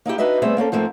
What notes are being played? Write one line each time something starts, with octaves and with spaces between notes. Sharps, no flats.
A#3 D#4 E4 G4
D4 D#4 F#4 B4 D#5 E5
G3 A3 B3 C4 G#4 E5
A#3 C4 C#4 A4
G#2 F3 A3 A#3 C4